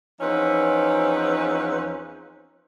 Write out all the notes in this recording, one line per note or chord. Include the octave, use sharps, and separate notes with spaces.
E2 F3 C4 C#4 D#4 B4